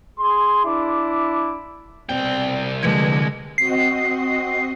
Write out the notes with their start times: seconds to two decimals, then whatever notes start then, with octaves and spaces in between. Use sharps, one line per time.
0.19 G#4 C6
0.65 D4 E4 D6
2.09 C2 B2 C4 D5 G5
2.83 D3 F3 F#3 G#3 A3 B4 G#6
3.58 C4 F#4 D#5 C7